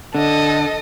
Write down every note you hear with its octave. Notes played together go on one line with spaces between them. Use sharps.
D3 A4 D#5